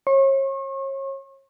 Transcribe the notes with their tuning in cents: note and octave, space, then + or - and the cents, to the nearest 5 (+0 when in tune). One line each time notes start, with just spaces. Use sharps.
C#5 -35 C#6 -40